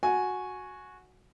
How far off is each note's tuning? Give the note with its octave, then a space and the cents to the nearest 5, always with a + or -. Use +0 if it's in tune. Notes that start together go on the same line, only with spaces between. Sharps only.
F#4 -10 G#5 +10